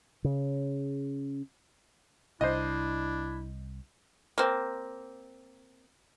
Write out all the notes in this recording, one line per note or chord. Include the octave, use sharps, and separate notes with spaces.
C#3
C2 D4 E4 C5 D#5
A#3 C4